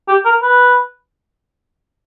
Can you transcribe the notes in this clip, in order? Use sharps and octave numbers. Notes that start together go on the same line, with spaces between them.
G4
A#4
B4